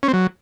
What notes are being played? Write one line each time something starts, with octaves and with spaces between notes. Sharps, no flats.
C#4
C4
F#3